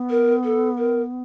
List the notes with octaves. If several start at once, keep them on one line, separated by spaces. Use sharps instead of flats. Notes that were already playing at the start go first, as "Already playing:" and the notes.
Already playing: B3
A#4
A4
A#4